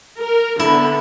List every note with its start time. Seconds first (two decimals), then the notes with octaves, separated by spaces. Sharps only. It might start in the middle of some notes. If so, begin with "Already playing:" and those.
0.19 A#4
0.60 D3 B3 E4